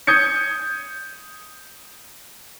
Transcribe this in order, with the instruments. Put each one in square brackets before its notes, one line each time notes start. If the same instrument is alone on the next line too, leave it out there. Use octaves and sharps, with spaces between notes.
[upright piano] D#6 G6 G#6 C#7